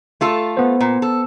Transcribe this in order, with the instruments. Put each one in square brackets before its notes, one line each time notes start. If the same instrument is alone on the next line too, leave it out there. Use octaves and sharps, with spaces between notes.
[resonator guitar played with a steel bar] A3 F4 A4
[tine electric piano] B3 C5
[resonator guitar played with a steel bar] A#2
A4